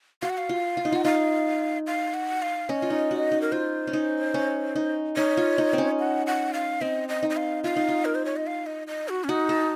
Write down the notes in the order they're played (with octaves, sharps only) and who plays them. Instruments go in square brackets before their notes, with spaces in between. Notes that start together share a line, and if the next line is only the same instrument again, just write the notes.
[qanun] F#4 [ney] F5
[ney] F#5
F5
[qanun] F4
F4
D#4
[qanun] F4 [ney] F#5
[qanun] D#4 [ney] F5
[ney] F5
F#5
F5
[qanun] C#4 [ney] D#5
[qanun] F4
D#4
F#4
D#4
[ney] A#4
[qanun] F4 [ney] C5
[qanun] C#4
D#4
C#4
D#4
[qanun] D#4 [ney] C#5
[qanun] F4
D#4
C4
C#4
[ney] F#5
F#5
F5
[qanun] C4 [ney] D#5
[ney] D#5
[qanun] D#4
[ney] D#5
F5
[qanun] F4 [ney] F5
[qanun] D#4
F4
[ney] A#4
C5
C#5
D#5
F5
D#5
D#5
F#4
C#4
[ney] D#4 [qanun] F#4
[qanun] A4